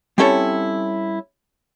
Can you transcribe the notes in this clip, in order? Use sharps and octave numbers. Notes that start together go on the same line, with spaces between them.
G3 C4 C#4 E4 A4 C#5